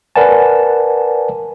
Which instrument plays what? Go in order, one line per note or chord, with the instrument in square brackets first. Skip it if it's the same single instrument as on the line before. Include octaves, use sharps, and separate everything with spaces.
[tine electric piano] A#4 B4 D5 F#5 G#5 A5